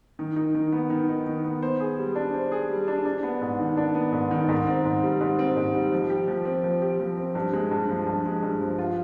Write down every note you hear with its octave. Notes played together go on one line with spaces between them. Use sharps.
D#3
D#4
D#3
B3
D#3
D#4
D#3
B3
C5
G#4
G3
D4
C5
G#4
G3
D4
D4
B3
G#2
D#3
D4
B3
G#2
D#3
G#2
C4
G#2
G3
G#2
C4
G#2
G3
F3
G4
F3
C4
F3
G4
F3
C4
G2
G#3
G2
F3
G2
G#3
G2
F3
F4